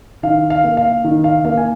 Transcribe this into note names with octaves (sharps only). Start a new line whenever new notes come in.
D#3 F5
F5
A#3
F5
D#3
F5
A#3 F5
G#5